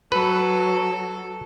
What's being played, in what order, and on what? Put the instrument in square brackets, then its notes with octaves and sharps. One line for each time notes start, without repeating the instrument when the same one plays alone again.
[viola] F#3 [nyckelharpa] A4 [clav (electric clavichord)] B4